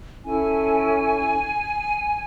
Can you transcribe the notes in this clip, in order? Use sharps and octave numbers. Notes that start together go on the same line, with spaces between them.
C#4 E4 A4 G#5